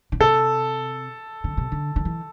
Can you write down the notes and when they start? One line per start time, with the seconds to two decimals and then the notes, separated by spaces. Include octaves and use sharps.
0.12 D3
0.20 C3 A4
1.44 D3
1.57 C3
1.72 D3
1.96 D3
2.05 E3